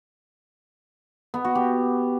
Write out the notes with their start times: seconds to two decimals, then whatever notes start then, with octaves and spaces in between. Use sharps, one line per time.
1.34 B3
1.45 F#4
1.55 G4